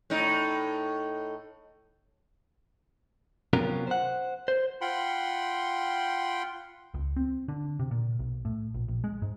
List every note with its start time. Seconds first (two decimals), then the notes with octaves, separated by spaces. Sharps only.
0.10 A2 D#4
3.53 C3 F#3 B3 C#4 F4 A#4
3.87 C5 F#5
4.48 C5
4.81 F4 F#5 G5 B5 C6
6.94 C#2
7.16 C4
7.48 D3
7.79 C3
7.91 A#2
8.19 B1
8.45 A2
8.74 A#1
8.88 A#1
9.04 G#3
9.22 G#2